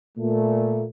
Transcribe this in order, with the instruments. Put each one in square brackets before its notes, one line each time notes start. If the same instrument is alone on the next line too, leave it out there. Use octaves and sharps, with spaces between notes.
[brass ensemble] A#2 A3